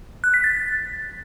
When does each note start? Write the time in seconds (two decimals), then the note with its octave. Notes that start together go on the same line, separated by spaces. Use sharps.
0.24 F#6
0.34 B6
0.44 A6